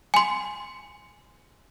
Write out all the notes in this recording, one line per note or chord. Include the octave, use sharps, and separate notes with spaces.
G#5 C6